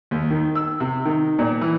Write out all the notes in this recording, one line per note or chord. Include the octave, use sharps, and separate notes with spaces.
D#2
D#3
E6
C3
D#3
A#2
E3